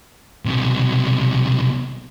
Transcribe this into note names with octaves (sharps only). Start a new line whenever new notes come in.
B1 C3